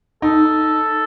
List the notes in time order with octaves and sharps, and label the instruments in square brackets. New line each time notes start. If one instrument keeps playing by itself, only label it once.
[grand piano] D#4 [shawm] A4